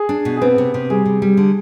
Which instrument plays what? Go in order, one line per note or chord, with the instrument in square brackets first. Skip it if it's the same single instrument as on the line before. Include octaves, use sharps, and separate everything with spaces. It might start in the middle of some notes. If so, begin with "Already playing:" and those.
Already playing: [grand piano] G#4
[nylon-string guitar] D4
B2
[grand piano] G#4
[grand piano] B3 B4 [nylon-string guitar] C4
[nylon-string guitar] C3
C3
[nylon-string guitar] G3 [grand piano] G#4
[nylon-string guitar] C3
G3
D3